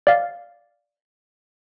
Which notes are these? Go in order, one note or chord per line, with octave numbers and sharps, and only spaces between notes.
D5 F5